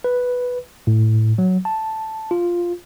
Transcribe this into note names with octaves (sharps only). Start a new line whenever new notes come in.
B4
A2
F#3
A5
F4